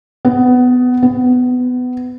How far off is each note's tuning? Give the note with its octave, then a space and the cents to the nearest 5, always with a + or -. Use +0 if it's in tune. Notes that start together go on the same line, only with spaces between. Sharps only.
B3 +15
B3 +20